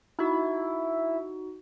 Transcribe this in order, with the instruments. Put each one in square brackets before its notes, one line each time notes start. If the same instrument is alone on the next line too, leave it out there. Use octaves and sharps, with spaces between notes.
[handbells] D#4 F#4 [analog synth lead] E4